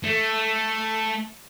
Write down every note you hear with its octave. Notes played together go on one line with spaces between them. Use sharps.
A3